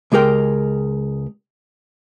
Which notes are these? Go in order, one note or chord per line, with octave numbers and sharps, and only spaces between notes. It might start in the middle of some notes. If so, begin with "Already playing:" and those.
C#2 G#3 G4 A#4 G5